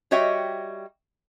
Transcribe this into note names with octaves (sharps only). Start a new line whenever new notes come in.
G3 F#4 C#5 D#5 E5 G5